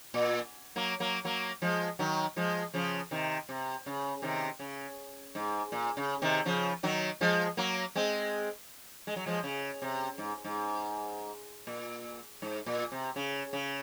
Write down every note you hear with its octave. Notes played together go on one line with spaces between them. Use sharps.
A#2
F#3 A#3
F#3 A#3
F#3 A#3
F3 G#3
D#3 F#3
F3 G#3
C#3 F3
C3 D#3
C3
C#3
C3 D#3
C#3
G#2
A#2
C#3
C3 D#3
C#3 F3
D#3 F#3
F3 G#3
F#3 A#3
G#3 C4
G#3
F#3
F3 G#3
C#3
C3
G#2
G#2
A#2
G#2
A#2
C3
C#3
C#3